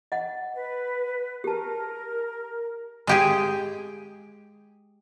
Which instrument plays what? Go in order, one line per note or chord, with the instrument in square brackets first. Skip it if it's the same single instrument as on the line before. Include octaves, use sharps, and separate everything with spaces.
[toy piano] D#5 F#5
[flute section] B4
[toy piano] G4 A5 [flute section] A#4
[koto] G#3 G4 G#4